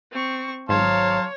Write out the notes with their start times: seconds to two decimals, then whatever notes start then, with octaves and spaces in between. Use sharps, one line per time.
0.12 C4 C#6
0.69 G#1 C#3 F3 F#3 C#5 F5 A5 C6